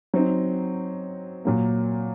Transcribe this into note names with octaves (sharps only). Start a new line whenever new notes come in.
F#3 C4 D#4
A#2 F#3 A#3